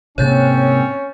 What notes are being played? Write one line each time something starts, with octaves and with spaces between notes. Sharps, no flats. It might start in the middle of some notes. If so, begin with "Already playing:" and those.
G#2 C3 A#3 C4 C#4 C#5 G6 A6